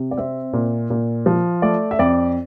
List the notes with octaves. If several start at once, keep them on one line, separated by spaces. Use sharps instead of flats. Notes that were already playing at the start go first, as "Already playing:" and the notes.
Already playing: C3
D5
C4 E5
A#2
A#2
F3
A3 D5
E5
F2 D5